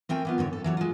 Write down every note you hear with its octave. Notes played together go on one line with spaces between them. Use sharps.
A3 C4 A#4 G5 G#5
E3 B3 F4
G#2 D3 B4 C#5
A4
E3 F#3 C#5
G#3 F4